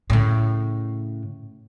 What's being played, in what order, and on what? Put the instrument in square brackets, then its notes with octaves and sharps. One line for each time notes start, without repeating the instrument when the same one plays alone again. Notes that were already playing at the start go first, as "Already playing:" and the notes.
[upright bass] A2 C#3